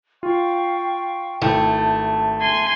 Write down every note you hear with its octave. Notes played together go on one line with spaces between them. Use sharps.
F4 F5 G5 C#6
G#1 A3 E4 G5 A5
G#5 C6